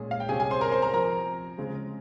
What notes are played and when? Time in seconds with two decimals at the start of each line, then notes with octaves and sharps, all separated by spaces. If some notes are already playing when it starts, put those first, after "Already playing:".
Already playing: A#2 G#3 C#4 G#4
0.11 F5
0.20 G5
0.29 C3 G3 C#4 G#4 G#5
0.40 G#4 G#5
0.51 C5 C6
0.61 A#4 A#5
0.72 C5 C6
0.82 A#4 A#5
0.93 F3 C4 A#4 A#5
1.58 C#3 G#3 C4